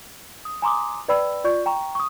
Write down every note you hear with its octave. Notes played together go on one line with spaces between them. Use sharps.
D#6
G#5 A#5 C6 D6 D#6
B4 D5 G5 B5 E6
F4 D5 C#6 G6
G5 A#5 C#6
C#6 D#6